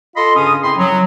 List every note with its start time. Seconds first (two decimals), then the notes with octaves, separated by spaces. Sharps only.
0.16 F4 A4 D#5 B5 C6
0.36 G2 C#3 C#4 D#6
0.63 F#2 C4 E4 B5 C6
0.78 F#3